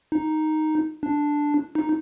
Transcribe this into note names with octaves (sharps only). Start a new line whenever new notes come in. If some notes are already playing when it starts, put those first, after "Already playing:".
D#4
D4
D#4